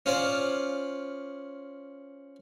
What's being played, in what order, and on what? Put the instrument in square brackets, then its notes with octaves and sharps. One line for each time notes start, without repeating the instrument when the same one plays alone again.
[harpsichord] C#4 F4 C5 D5